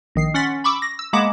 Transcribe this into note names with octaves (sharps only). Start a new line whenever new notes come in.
A#1 D#3 C7
C#4 F#5 C6 A6 B6
B5 C#6 D6 E6
A#6
E6
G#3 A#3 B3 F#5 D6 E7